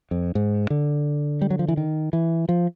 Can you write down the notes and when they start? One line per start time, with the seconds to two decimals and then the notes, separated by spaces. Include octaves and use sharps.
0.11 F2
0.35 G#2
0.70 D3
1.42 G3
1.50 F#3
1.59 F3
1.68 E3
1.77 D#3
2.13 E3
2.49 F3